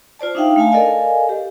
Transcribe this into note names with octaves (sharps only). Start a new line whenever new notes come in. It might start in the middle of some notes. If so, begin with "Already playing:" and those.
F4 C5 D5 A5
D4 D#4 E5 F5 G5
A3 F5 G#5 A5
A4 A#4 D5 D#5 F5 G#5
G4